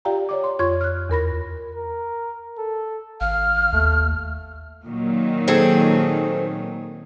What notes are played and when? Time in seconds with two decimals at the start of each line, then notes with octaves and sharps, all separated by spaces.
0.05 F4 G4 D5 F5 G5 A#5
0.29 C#5 D5 D6
0.44 C6
0.59 F2 F4 C#5 C6 C#6 G#6
0.81 F6 F#6
1.10 E2 A#4 B5 A#6
1.75 A#4
2.58 A4
3.21 G#1 F5 F6
3.73 D#2 A3
4.85 A#2 D#3 F#3
5.48 C4 G#4 A4